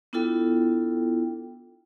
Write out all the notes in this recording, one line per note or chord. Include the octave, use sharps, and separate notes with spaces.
B3 D4 E4 F4 A4 G5